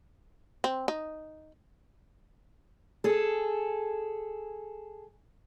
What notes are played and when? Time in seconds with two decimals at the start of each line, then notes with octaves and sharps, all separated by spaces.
0.64 C4
0.88 D#4
3.04 G#4 A4